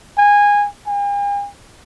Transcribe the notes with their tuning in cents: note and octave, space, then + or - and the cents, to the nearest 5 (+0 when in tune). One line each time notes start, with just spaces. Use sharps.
G#5 -20
G#5 -45